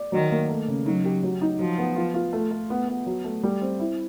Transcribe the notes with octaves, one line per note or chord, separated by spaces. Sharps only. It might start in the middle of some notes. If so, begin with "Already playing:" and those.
Already playing: D5
D#3 F#3
A#3
A3
C#3
F#3 D#4
G4
F#3
D#4
F3 F#3
B3
F4
F4
A3
A3
B3
B3
F#3
A3
G3
C4
E4